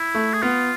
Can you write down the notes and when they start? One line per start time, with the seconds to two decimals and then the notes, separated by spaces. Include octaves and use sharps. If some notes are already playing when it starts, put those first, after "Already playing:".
Already playing: E4
0.15 A3
0.34 G#4
0.42 B3 F4